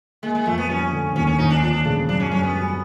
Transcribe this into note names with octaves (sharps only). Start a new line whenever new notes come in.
G#3 A#3
G#3
F2 A3
B3
G3 C#4
D3
D#2 C#4
C#4
D#2 D#4
D4
F3 D4
D4
C#3 D4
F#2 D4
C#4
F#2 C#4
B3
G3